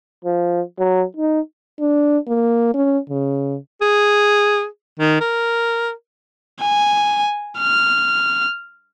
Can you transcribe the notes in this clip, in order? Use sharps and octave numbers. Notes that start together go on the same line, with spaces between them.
F3
F#3
D#4
D4
A#3
C#4
C#3
G#4
D#3
A#4
G#5
F6